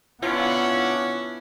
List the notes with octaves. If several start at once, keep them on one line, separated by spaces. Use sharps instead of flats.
B3 C#4 D4 E4 F4 F#5